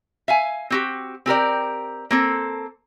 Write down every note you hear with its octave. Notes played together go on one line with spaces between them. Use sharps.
E5 F5 G#5
C4 F#4 G4
C4 G4 A#4 D5
A#3 C4 A4